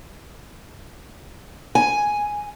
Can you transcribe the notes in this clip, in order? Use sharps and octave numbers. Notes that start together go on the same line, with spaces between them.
G#5